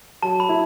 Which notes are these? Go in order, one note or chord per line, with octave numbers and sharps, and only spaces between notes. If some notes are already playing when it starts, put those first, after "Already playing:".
F#3 A5
B5
E4